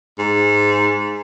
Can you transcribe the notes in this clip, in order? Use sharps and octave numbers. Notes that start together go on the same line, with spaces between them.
G#2